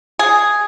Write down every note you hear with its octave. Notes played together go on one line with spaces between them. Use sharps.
G#4